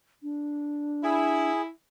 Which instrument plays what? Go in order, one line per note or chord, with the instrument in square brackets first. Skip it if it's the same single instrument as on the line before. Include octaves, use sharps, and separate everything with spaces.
[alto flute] D4
[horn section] E4 [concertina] G#4